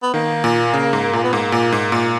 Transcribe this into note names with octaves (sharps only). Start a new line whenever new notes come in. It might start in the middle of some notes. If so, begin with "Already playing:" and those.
B3
D#3 A#3
A#2
C#3
G#2
A#2
B3
G#2 A#3
A#2
G#2
A#2